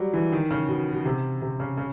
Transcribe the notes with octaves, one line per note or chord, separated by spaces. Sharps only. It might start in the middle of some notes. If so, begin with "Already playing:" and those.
Already playing: F#3 G3
E3
D#3
C#3
B2
B2
C3
C3
C#3
C#3